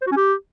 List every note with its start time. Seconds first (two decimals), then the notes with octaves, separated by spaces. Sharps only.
0.01 C5
0.07 F#4
0.12 C#4
0.17 G4